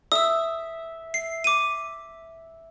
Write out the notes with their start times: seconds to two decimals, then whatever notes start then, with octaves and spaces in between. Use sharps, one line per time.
0.12 E5 D#6 E6
1.14 C7
1.44 D6 D#7